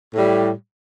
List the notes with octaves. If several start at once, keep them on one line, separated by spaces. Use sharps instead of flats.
A2 G3